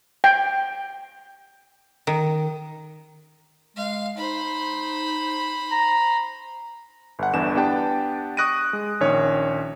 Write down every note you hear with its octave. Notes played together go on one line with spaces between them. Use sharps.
G5
D#3
G#3 F5
D#4 C5 B5
A#5
G1 F#5
G1 E2 E3 D4 E7
B3 D4 G4 G5 A5
C#6 D#6 F#6 A#6 D7 D#7
G#3
A#1 D#3 C#4 C#5